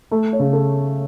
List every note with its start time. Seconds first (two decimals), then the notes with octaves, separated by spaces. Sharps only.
0.11 A3
0.33 C#5
0.39 C#3
0.53 A4